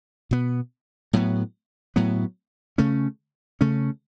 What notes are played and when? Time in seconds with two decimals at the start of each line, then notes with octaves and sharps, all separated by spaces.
0.31 B2 B3
1.13 A2 F#3 B3
1.96 A2 F#3 B3
2.78 C#3 A3 C#4
3.61 C#3 A3 C#4